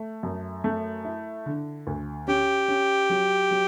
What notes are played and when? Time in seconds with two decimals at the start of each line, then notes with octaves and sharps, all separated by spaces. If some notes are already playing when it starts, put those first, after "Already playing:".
Already playing: A3
0.23 F#2
0.64 A3
1.05 E4
1.46 D3
1.87 D2
2.28 C#4 G4
2.68 C#4
3.10 F#3
3.51 F#3